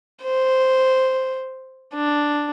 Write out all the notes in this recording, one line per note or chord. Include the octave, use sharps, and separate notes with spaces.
C5
D4